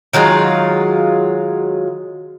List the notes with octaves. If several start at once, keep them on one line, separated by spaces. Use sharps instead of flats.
D#3 F#3 G#3 F4